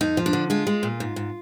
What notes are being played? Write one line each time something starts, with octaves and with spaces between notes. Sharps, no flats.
F2 D#4
F3
D4
D3
G#3 F4
G#3
A#2
G#2
G#2